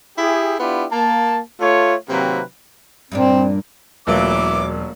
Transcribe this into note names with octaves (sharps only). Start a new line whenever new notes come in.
E4 G4 G#4
B3 D4 E4 F4 G4
A#3 A5
A3 F4 C#5
C3 D#3 F#3 A#3 C4 B4
G2 A#2 C4 D4
E1 E3 F#3 A3 A#3 F4 D6